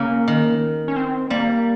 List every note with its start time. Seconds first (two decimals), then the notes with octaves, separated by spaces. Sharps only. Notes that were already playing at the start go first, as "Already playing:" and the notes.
Already playing: C#3 A#3
0.28 D#3
0.88 C#4
0.96 C4
1.30 G3 A#3